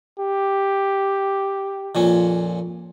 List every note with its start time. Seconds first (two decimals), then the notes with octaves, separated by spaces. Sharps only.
0.19 G4
1.95 F2 A#2 C#4